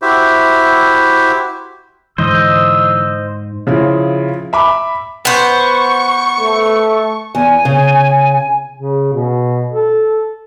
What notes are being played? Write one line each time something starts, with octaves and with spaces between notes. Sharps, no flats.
E4 F#4 G4 C5 E5
G#2 D3 E3 C5 D#5 E6
C#3 F3 E4
E5 B5 D6
B3 C5 C#6
A3
E2 G#5
C#3
C#3
B2
A4